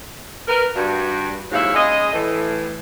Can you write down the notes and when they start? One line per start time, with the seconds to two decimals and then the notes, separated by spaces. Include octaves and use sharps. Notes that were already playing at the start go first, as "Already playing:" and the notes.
0.48 A#4 B4
0.76 G2 F#4
1.51 D#2 G#2 F#3 E4 C#5 F5
1.75 C#3 G#3 G#4 D#5
2.13 A2 E3